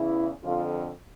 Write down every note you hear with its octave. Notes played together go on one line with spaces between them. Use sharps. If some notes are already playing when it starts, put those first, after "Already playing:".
Already playing: E2 C#3 E3 E4
F2 D3 F4